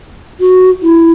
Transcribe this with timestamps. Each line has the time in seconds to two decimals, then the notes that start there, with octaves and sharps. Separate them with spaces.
0.40 F#4
0.83 E4